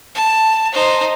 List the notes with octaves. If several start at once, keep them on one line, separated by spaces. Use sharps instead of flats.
A5
D#4 C5